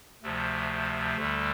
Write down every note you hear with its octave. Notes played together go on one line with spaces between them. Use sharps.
D2 C3 F3 A3
D2 D3 G3